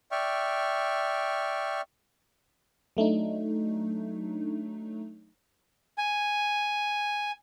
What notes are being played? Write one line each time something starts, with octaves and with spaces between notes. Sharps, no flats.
D5 E5 G5 C#6 F6
F#3 A3 D4 D#4
G#5